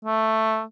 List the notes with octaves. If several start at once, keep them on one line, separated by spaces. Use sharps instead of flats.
A3